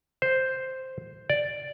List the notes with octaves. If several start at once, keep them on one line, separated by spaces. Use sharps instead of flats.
C5
D5